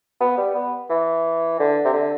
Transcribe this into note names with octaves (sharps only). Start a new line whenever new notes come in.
B3
G3
B3
E3
D3
C3
D3